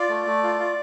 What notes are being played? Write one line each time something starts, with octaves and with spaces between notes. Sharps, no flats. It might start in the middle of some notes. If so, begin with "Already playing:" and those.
Already playing: F4 D5
A3
A3
F4
F4